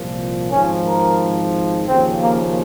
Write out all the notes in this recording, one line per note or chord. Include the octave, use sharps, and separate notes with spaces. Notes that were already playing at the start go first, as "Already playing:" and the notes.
Already playing: C2 A#2 F3
G#1 G#2 F3 C#4
A#4
D#2 C#3 F3 C4
A#3